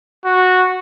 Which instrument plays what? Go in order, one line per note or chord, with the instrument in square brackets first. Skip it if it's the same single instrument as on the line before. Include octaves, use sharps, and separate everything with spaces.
[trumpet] F#4